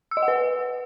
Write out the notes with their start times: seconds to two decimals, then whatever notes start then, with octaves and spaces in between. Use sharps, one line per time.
0.11 E6
0.17 D#5
0.22 F#5
0.28 B4